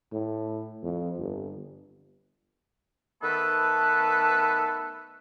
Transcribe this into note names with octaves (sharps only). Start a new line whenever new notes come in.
A2
F2
G1
D#3 A3 B3 A4 B4